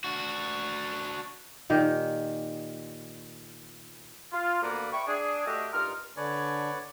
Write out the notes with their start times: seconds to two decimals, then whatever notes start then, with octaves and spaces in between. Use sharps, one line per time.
0.05 D4 F#4
1.70 A#2 D#3 G4
4.33 F4
4.63 D2 A#3 B3 A#4 B4 D5
4.93 E5 G5 B5 C#6
5.07 D4 G#4
5.46 A3 D4 F#4 G4 A4 D#5
5.73 G2 D#4 F4 A#4 F6
6.17 D3 D4 B4 C#5 D5 G#5